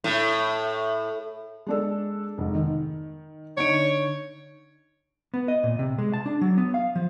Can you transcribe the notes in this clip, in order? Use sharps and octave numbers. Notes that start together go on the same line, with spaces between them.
A2
G#3 D4 A4
F1 G#2
D#3
D3 D#4 C#5 D7
B3
D#5
A#2
C3
G#3
A5
D4
F#3
B3
F5
F3